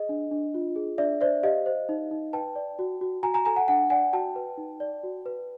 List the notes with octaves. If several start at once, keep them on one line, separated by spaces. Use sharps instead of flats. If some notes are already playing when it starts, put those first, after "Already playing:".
Already playing: G#4 D#5
D4
D4
F4
G#4
D4 D5 E5
C5 D5 E5
G4 D#5 F5
C5
D#4
D#4
B4 G5 A5
D5
F#4
F#4
F#4 G#5 A#5
G#5 A#5
A4 G#5 A#5
F#5 G#5
D4 F#5 G#5
D5 F#5 G#5
F#4 G5 A5
B4
D#4
D5
F#4
B4